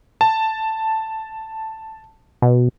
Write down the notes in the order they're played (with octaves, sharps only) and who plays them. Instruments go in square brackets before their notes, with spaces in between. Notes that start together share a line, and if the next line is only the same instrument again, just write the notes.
[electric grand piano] A5
[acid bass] B2